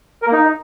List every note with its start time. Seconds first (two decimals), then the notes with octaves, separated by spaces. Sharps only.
0.22 A#4
0.27 A#3
0.32 D#4